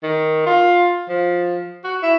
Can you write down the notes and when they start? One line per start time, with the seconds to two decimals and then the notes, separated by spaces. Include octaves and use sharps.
0.03 D#3
0.47 F4
1.09 F3
1.84 F#4
2.03 E4